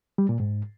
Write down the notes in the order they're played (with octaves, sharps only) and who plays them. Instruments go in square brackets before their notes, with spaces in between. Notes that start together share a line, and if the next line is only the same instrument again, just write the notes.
[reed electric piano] G3
A#2
G#2